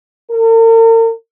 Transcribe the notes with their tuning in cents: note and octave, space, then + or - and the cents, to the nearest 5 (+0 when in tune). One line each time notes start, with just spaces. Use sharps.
A#4 -45